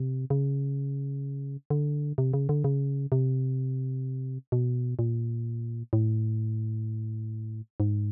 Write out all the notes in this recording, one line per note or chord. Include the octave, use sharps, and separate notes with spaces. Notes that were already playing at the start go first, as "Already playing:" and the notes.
Already playing: C3
C#3
D3
C3
C#3
D3
C#3
C3
B2
A#2
A2
G#2